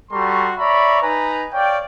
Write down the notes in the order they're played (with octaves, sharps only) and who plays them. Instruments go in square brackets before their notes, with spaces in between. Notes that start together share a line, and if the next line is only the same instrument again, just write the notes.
[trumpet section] G3 F#4 A4 A#5 C6 C#6
C#5 D5 E5 A#5 B5 C#6
D#4 B4 G#5 A#5
C#5 D5 F5 G5